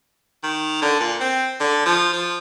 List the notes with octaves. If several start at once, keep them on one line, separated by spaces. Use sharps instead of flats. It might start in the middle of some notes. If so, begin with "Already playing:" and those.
D#3
D3
A#2
C4
D3
F3
F3